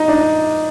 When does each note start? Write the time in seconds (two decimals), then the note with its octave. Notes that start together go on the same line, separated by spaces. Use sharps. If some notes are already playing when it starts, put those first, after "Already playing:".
Already playing: D#4
0.08 D4